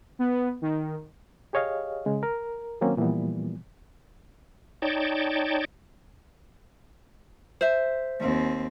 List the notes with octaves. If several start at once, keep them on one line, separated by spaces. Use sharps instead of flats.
B3
D#3
G4 G#4 C#5 D#5 F5
C#3 G#3
A#4
D#3 F#3 A#3 C4 C#4
A#2 E3 F3 G3 B3
D#4 C#5 D5 G5 A5
C5 E5
D#2 C4